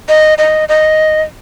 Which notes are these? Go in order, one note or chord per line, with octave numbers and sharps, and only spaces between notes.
D#5
D#5
D#5